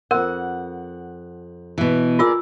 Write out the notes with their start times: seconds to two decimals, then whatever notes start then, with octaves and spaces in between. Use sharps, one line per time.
0.11 F2 A#4 F#5
1.78 B2 E3
2.19 F4 G#4 A#4 D5 E6